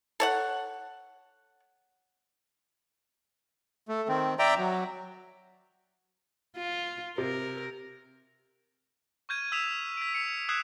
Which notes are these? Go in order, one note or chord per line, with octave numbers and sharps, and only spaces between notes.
A4 C#5 F#5
A3
D#3 C4
D5 E5 G5 A#5
F#3
F4
C3 A#4
C#6 F6 G6 G#6 D#7
D#6 E6 B6 E7 F7
B6 D7
C#7 F7
D#6 E6 F#6 G#6 C7 E7